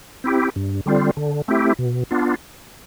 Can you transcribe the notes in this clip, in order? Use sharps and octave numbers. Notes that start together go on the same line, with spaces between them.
C4 E4 G4
G2
D3 G3 C4 F4
D3
A3 C4 E4 G4
B2
B3 D4 F4